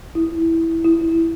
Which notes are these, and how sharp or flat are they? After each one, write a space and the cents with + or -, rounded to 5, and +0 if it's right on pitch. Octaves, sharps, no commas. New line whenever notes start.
E4 -5
E4 +5